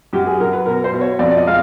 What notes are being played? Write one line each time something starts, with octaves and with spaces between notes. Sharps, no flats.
F#2 G4
G#4
F#2 A#4
B4
B2 A#4
C5
B2
C#5
F2 D5
D5
D#5
G#3 F5